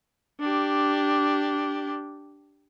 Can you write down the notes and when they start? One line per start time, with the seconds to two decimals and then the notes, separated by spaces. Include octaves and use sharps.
0.40 D4 G4